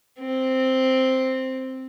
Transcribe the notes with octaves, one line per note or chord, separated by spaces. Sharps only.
C4